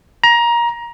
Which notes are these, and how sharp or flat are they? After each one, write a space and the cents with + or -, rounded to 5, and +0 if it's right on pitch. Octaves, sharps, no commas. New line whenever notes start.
A#5 +20